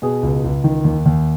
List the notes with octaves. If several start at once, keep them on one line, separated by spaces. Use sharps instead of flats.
B2 G#4
C#2
C#2
D#3
D#2
D#2